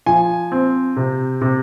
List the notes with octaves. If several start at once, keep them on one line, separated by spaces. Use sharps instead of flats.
F3 G#5
C4
C3
C3